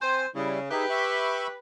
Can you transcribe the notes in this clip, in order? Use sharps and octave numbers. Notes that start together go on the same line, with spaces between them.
C4 C5 G#5
C#3 G3 E4
D#4 G4 G#4 B4 E5
E5 B5 C#6